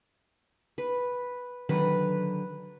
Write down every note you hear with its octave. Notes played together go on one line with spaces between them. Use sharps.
B4
D3 D#3 F#3 B4